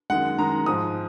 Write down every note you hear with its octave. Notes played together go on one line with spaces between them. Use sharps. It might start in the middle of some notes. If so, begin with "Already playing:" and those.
F#2 D#3 G#3 F#5
F#2 D#3 G#3 A#5
G#2 F3 G#3 D#6